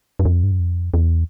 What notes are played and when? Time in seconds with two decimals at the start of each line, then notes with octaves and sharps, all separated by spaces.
0.19 F#2
0.25 F2
0.43 G2
0.52 F#2
0.60 F2
0.94 E2